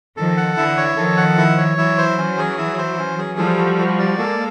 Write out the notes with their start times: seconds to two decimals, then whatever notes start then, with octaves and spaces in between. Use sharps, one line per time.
0.16 D#3 F3 A4
0.37 F#5
0.57 D3 E3 E4
0.77 C#5
0.96 D#3 F3 A4
1.17 F#5
1.38 E4
1.58 C#5
1.77 E3 F#3 E4
1.98 C5
2.18 C#4
2.38 G#4
2.58 E4
2.78 C5
2.99 C#4
3.18 G#4
3.38 F3 G3 A4
3.58 F#4
3.78 F#4
3.99 D5
4.19 G#3 A#3 A4